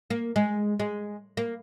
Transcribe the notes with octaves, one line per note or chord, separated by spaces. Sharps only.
A#3
G#3
G#3
A#3